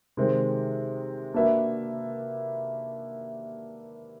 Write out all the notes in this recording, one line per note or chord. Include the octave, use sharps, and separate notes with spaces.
C3 D#3 G#3 C4
A#3 D4 F#4 B4 E5